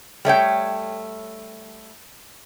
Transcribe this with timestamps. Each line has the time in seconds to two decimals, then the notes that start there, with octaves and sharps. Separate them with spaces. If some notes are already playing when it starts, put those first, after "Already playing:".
0.25 G3 A3 C#5 G5